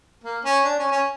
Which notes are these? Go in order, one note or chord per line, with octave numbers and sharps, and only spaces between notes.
A#3
C#4
D4
C#4
C#4